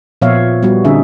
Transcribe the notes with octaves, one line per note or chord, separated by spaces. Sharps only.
A#2 F3 B3 C#5 E5 F5
G3 B3 F#4
D3 C#4 D#4 G#4 E5